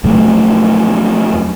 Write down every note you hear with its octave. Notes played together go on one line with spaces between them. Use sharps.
F2 B2 F#3 A3